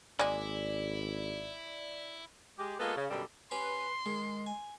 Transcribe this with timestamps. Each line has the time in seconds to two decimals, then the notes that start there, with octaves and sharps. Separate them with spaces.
0.19 G#1 G#3 A#3 E4 G#4 D5
2.58 G#3 G4
2.79 G#3 A#3 B3 F4 A4
2.96 C#3
3.09 F#2 B2 D3 G3
3.51 C#4 G4 B4 C6
4.06 D#3 G#3
4.46 G#5